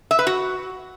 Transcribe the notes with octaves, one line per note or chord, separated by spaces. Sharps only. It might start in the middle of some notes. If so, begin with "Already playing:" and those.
E5
B4
F#4